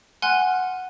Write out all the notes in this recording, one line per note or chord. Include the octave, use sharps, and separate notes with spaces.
F#5 G#5 C6 F6 F#6